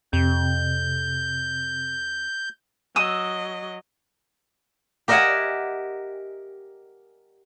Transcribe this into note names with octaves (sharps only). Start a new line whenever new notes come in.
F2 C3 G6
F#3 D#5 D#6 E6
G4 A#4 D#5 E5 F#5 G#5